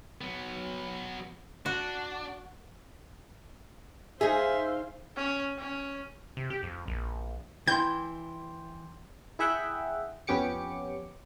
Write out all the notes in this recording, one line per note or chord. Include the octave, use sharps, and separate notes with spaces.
F#3 B3
D4 F#4
D#4 G#4 C5 E5 F5
C#4
C#4
C3
G4
F2
A#1
E3 G5 C6 G6
E4 G#4 E5 F#5 G5
F2 B3 C#4 G4 D6 C#7